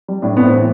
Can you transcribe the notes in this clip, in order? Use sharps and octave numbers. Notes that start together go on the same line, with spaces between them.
G3
A2 D4
A2 B3
C4
E3